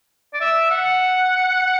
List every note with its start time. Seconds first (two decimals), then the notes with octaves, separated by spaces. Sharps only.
0.34 D5
0.41 E5
0.71 F#5